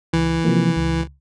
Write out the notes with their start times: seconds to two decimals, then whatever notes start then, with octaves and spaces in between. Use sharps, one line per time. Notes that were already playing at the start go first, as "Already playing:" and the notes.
0.13 C#2 E3
0.44 C3 F3 A#3
0.76 C#2